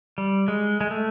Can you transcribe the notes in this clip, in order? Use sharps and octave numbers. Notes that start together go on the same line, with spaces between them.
G3
G#3
G#3
A3